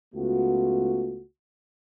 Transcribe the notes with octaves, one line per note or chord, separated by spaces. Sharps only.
C#2 A3 B3 F4 F#4